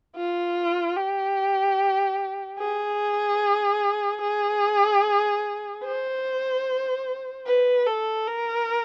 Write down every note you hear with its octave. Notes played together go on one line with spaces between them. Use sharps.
F4
G4
G#4
G#4
C5
B4
A4
A#4